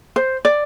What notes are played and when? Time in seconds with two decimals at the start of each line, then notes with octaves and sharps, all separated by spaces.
0.16 C5
0.45 D5